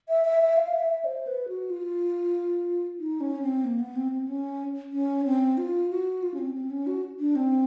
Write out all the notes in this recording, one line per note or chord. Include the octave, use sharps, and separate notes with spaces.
E5
E5
E5
F5
E5
E5
C5
B4
F#4
F4
D#4
C#4
C4
A#3
B3
C4
C4
C#4
C#4
C4
F4
F#4
F4
C#4
C4
C4
C#4
F#4
D4
C4